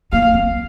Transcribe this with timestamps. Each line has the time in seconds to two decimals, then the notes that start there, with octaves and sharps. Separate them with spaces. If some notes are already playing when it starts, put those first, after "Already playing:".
0.12 A#3 F5
0.34 C4